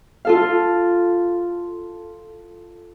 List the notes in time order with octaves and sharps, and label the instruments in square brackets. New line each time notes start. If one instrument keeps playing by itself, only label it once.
[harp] F4 A4 F5